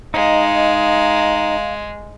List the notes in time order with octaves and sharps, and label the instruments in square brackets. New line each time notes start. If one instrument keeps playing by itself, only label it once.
[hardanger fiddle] G#3 [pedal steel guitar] D#4 [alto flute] F5